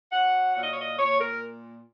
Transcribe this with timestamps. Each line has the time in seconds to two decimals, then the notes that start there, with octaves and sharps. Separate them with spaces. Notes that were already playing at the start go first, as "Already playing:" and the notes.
0.12 F#3 F#5
0.55 A#2 F#5
0.63 D#5
0.72 C#5
0.80 D#5
0.98 A#2 C#5
1.20 A#4